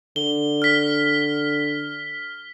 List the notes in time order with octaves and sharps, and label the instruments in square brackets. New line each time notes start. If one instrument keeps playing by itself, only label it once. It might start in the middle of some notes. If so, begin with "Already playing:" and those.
[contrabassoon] D3 [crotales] G7
[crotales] F6 B6